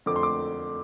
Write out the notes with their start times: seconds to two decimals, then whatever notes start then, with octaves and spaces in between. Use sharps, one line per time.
0.06 F2 D3 A3 C4 D6
0.16 C6
0.23 D6